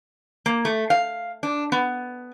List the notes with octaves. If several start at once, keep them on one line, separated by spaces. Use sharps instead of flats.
A#3
A3
F5
D4
B3